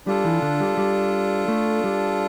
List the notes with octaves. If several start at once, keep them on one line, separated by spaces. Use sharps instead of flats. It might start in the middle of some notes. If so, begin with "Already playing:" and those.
G3 D4 F4 A4
E3
D3
G3
G3
A3
G3